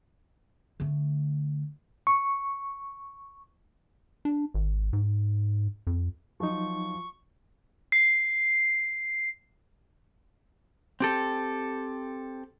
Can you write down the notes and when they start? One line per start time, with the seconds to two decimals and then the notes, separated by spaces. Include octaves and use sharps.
0.80 D3 A3
2.07 C#6
4.25 D4
4.54 G#1
4.93 G#2
5.87 F2
6.40 F3 F#3 D#4 F#4 C#6
7.92 C7
11.00 C4 G4 A4